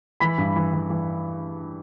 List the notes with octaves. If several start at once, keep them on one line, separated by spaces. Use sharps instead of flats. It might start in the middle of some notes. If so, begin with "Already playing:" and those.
E3 B5 B6
G2
E3
E3
E3